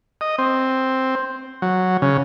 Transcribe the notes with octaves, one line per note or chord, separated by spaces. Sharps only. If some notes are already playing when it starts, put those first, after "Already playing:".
D#5
C4
F#3
C#3